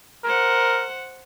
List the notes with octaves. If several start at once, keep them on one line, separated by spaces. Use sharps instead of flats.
A#4 C5 F#5